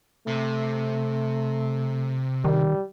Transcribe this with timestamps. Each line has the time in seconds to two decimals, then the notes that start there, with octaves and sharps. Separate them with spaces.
0.27 C3 A3
2.45 D#3 G3